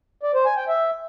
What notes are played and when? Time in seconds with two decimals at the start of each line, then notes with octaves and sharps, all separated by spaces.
0.23 D5
0.34 C5
0.45 G#5
0.57 G5
0.68 E5